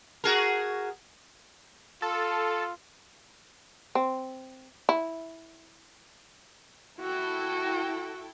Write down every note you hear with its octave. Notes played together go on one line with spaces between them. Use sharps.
F#4 G#4 A#4
F4 A4
C4
E4
E4 F#4 A4 G5